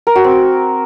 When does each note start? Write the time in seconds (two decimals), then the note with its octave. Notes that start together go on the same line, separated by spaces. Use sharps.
0.07 A#4
0.16 F#4
0.24 C4